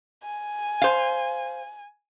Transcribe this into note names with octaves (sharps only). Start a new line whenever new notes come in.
G#5
C5 F5